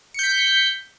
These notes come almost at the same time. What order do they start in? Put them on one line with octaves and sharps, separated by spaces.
C#7 G6 B6